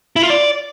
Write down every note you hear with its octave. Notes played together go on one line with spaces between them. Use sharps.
E4
F4
D5